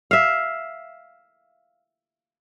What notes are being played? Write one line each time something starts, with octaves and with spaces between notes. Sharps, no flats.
E5 F5